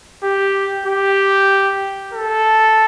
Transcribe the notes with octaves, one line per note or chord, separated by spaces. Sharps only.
G4
G4
A4